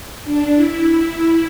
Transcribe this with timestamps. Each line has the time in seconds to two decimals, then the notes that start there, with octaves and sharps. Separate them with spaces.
0.25 D4
0.56 E4
0.88 E4